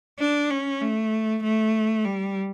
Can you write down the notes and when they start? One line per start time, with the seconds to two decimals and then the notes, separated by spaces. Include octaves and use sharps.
0.19 D4
0.50 C#4
0.81 A3
1.43 A3
2.05 G3